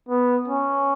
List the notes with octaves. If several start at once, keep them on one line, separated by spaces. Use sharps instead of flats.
B3
C#4